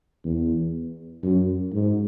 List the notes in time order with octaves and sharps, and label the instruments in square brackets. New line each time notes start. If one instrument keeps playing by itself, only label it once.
[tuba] E2
F#2
G#2